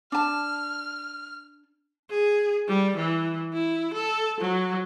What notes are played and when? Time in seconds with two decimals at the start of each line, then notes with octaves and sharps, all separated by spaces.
0.12 D4 A5 F6
2.10 G#4
2.68 G3
2.97 E3
3.53 E4
3.94 A4
4.41 F#3